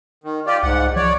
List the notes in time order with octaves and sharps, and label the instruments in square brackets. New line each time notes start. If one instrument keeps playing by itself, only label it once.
[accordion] D#3
F4 G4 D5
[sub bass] C2 [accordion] G#2 F#5
[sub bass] F3 [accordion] C#5 D5